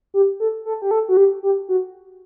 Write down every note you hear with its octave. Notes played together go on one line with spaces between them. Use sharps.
G4
A4
A4
G4
A4
F#4
G4
G4
F#4